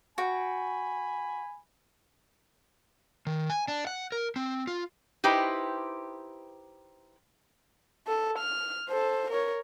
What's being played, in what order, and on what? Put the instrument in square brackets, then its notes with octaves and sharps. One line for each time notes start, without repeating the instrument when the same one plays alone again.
[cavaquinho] F#4 G5 [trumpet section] G#5 B5
[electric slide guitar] D#3
G#5
D4
F#5
A#4
C4
F4
[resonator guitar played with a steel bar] D#4 E4 G4 B4 C5
[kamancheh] A4
F6
A4 C5
A#4 C#5